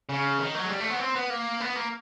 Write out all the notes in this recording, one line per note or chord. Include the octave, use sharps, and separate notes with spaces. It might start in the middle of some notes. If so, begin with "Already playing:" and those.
C#3
D#3
F#3
G#3
G3
A3
B3
C4
B3
A#3
B3
A#3